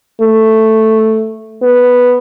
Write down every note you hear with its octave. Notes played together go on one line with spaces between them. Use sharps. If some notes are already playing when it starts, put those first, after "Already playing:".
A3
B3